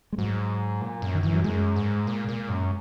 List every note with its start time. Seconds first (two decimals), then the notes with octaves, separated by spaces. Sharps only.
0.13 G#3
0.18 G#2 F#3
0.81 A#2
1.02 F#2
1.15 D#3
1.23 F#2 E3
1.34 F#3
1.44 F#2 G#3
1.76 G#2
2.07 A#2
2.28 A#2
2.49 F#2